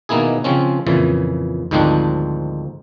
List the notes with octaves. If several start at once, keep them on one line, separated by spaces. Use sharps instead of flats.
B2 D#3 A#3 B3 E4 G#4
C#3 F3 C4 C#4
F2 A#2 C#3 E3
D2 G#2 D#3 F3 C4 D4